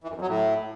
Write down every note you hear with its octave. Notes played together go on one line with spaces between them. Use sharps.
E3
F#2
F2
F#3
A2